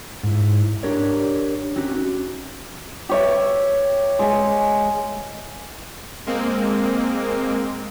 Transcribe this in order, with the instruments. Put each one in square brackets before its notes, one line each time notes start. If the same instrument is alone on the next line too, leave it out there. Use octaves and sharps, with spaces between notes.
[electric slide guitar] G#2 E4
D4 G4 A#4 C#5 D5
C4 C#4 D#4 F#4 G4
[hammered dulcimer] G4 C#5 E5
G#3 G#5
[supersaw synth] G#3 A#3 C4